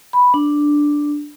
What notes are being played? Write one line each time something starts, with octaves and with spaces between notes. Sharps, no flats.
B5
D4